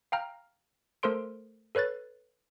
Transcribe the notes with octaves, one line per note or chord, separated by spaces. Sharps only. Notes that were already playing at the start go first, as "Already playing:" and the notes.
F5 G5 A#5 F6
A3 A4 A#4 C5 C6 D7
A4 B4 C#5 F#6 A6